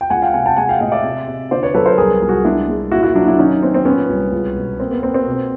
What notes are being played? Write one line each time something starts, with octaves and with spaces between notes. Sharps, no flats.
G5
C#2 F#5 G#5
F5 G5
C3 F#5 G#5
G5 A5
G#3 F#5 G#5
F5 G5
A2 D#5 F5
D5 E5
C3
C3
D3 C5 D5
B4 C#5
F#3 A4 B4
A#4 C5
C2 G#4 A#4
C2
F#4 G#4
G#3 D4 E4
G#3
A#2 E4 F#4
E4 F#4
F#3 D4 E4
D4 E4
D#3 C#4 D#4
B3 C4
C4
A#2 B3 C#4
C2
C#2
B2
A#3 C4
B3
A#3 C4
C4
B2